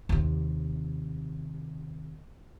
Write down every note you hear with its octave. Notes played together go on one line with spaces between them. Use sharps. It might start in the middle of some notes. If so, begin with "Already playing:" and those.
D#2 C3